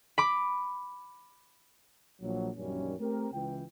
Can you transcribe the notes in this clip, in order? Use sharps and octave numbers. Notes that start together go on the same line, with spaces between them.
B5 D6
A#1 F#3
A#1 F#2 A#2 D#3 G3 C#4
A3 C4 G4 A#4
C#2 E3 G5